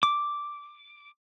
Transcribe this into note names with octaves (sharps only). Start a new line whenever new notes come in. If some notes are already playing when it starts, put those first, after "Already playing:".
D6